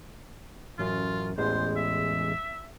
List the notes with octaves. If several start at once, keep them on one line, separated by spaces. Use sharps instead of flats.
A1 F#2 F4
A1 E2 G#3 C5
E5